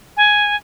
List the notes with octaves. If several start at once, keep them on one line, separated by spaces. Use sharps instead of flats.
G#5